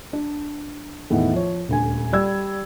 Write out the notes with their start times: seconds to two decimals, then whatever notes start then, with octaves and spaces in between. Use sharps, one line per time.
0.13 D4
1.10 E2 A2 D#3 B3
1.33 F3 C#5
1.68 D#1 D2 G#5
2.13 G3 D5 E6 G#6